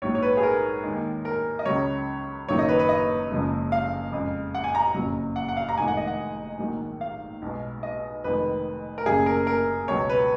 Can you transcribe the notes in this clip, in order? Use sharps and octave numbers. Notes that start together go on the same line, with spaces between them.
A#1 G#2 F#3 C#5
C#5
B4
G#4
A#4
D#2 D#3 G#3
A#4
D#5
C#2 C#3 F#3 C#5
F#1 F#2 D#3 F#3 C#5
D#5
B4
B4
D#5
F#1 F#2 C#3 F3 G#3
F5
F2 C#3 G#3
F#5
G#5
A#5
F#1 F2 C#3 F#3
F#5
F#5
F5
A#5
F1 F2 D#3 G#3 G#5
F#5
D#5
F#5
A#1 G#2 D#3 F#3
F5
B1 B2 G#3
D#5
F1 F2 D#3 G#3 B4
A#4
F#1 F#2 C#3 G#4
A#4
A#4
C#2 B2 F#3 C#5
B4